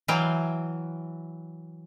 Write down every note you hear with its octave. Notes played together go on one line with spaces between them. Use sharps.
E3 F#3 F5 G5